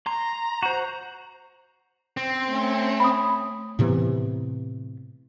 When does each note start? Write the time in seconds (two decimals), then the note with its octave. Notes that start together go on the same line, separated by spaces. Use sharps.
0.07 A#5 C6
0.63 F#4 C5
2.17 C4
2.48 A3 C#4
3.00 B5 D#6
3.79 A2 C3 E3 B3